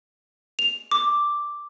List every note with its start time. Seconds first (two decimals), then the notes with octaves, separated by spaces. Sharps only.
0.59 F7
0.91 D6